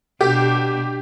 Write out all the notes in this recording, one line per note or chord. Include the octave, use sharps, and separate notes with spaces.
B2 D4 G4